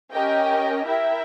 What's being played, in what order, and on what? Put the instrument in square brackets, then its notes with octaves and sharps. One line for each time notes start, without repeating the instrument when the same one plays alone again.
[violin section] C#4 G4 A#4 D#5 G5
E4 A#4 E5 G5